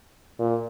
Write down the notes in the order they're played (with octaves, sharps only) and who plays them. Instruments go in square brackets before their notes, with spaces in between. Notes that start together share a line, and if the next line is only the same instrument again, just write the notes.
[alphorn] A#2